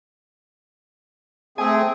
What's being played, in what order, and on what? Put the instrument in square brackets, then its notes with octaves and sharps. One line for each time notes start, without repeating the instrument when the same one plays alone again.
[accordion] A3 C4 G#4 [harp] G#5